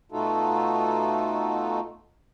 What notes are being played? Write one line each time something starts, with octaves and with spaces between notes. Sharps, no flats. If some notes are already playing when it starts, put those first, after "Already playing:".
B2 A3 D#4 F4 F#4 A4